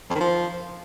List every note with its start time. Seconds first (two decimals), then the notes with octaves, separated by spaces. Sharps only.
0.10 F2
0.15 D#3
0.20 F3